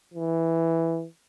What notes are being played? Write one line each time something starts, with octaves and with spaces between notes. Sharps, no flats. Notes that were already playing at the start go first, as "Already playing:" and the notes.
E3